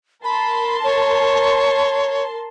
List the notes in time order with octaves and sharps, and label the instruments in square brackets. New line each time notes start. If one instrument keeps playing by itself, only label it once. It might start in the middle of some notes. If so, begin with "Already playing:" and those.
[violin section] A#4 A5 C6 [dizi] B5
[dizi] C#5